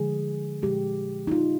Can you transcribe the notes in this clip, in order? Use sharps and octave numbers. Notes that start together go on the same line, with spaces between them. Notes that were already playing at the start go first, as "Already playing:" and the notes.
Already playing: D3 F3 G#3 G#4
A#2 F3 G#3 G4
D#4
F4